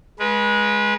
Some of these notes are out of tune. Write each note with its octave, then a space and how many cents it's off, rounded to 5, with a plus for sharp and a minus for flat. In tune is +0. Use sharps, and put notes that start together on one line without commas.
G#3 +5 B4 -30